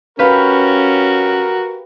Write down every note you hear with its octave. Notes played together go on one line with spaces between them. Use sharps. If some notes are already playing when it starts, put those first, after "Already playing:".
C#4 F#4 G4 A#4 B4 F5